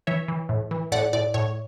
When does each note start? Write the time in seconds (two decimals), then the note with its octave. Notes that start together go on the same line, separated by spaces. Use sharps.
0.07 E3 C#5 E5
0.28 E3
0.49 A2
0.71 E3
0.92 A2 D5 F#5
1.13 A2 D5
1.34 A2 C#5